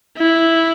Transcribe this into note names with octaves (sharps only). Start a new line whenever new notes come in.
E4